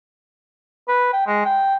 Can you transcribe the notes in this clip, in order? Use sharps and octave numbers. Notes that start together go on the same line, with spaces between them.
B4
G5
G#3
G5